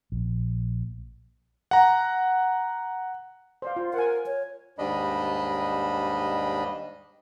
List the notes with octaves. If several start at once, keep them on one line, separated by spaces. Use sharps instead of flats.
A#1
F#5 A#5
C5 D5 F5
F4
A#4 F#5 G#5
C#5
D#2 G#2 G3 D4 D#5 B5